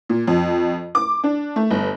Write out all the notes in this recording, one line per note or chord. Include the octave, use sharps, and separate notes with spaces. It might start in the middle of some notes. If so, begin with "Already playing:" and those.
A#2
F2
D6
D4
A3
G1